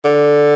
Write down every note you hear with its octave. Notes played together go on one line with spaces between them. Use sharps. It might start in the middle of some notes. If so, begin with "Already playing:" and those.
D3